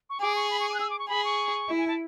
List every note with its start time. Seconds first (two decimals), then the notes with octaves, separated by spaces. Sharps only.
0.10 C#6
0.21 G#4 D6
0.36 C#6
0.50 B5
0.60 C#6
0.69 D6
0.74 F#6
0.80 E6
0.90 D6
0.99 C#6
1.09 G#4 B5
1.25 C#6
1.68 E4
1.78 G#5
1.88 A5